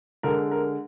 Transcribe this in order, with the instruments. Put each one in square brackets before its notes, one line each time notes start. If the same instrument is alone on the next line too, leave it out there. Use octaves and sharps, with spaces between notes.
[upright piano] D3 G#3 A#4
A#4